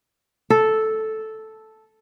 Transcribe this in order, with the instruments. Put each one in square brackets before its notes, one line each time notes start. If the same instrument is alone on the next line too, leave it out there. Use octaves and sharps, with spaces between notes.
[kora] A4